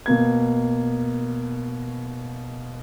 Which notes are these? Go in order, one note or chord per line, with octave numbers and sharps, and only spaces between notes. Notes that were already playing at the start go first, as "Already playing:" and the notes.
B2 A#3 G#6